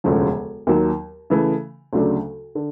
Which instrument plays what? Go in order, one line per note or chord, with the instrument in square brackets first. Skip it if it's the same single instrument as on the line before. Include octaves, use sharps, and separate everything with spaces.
[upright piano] E1 D2 C#3 F3
D#2 D#3 F#3
C#3 E3 A3
D2 C#3 F#3 A3 D4
D3